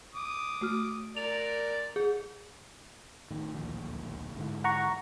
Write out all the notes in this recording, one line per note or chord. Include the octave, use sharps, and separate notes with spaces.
D6 D#6
A3 F#4 F6
A#4 D5 F7
G#4
A2 D#3
D1 A#1 D#2
G#2 D3 E3
F#5 A#5 C#6